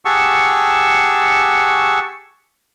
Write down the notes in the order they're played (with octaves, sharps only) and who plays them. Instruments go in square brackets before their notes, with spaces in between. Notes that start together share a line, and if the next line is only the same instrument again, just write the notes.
[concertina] G4 G#4 F#5 A5 C#6 E6